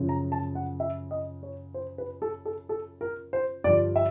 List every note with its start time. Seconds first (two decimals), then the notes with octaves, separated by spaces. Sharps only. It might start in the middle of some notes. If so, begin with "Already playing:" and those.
Already playing: F#2 C#3 F3
0.09 A#5
0.32 A5
0.55 F#5
0.80 E5
1.11 D#5
1.43 C#5
1.74 C5
1.98 B4
2.22 A4
2.45 A4
2.69 A4
3.01 A#4
3.33 C5
3.64 G2 D3 F3 D5
3.96 E5